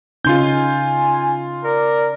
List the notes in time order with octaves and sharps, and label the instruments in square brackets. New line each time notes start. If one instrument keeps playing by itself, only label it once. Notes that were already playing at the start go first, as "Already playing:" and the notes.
[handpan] C#3 C#4 D#4 [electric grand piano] F4 C6 G6 [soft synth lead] G#5
[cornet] A#4 [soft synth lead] D5